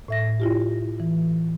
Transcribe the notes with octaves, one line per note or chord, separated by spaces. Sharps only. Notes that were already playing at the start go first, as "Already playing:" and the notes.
A2 E5 A#6
E4 F4 G4
E3